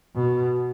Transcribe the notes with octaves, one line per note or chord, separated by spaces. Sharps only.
B2